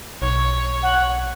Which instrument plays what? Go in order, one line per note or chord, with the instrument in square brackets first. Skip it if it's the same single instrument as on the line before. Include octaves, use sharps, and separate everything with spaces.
[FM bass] B1 [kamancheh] C#5
[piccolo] F#5